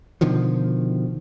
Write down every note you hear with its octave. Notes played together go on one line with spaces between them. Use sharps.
B2 D3 D#3 F3